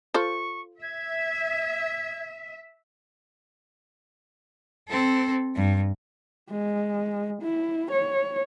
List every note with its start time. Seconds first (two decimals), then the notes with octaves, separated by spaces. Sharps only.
0.14 F4 A4 C5 C#6
0.82 E5 G#6
4.88 C4 A4
5.56 G2
6.49 G#3
7.42 E4
7.91 C#5